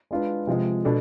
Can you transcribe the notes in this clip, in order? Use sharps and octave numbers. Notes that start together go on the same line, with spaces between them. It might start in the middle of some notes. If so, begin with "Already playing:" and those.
G#3 D4 F4 B4
C3 F3 G#3
B2 B3 D4 A4